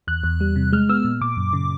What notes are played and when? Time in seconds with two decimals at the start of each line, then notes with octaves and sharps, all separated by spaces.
0.07 E2 F#6
0.24 E2
0.41 G3
0.56 C3
0.73 G#3 F6
0.89 B3 E6
1.04 A#2
1.21 A#2 D6
1.37 F#2
1.53 C#3